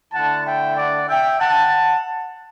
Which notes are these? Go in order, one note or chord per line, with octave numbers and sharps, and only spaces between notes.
D3 A3 E4 F#5 A5
E5 G5
D5 F#5
E5 G5
F#5 A5